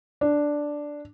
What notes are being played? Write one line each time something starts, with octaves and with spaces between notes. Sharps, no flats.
D4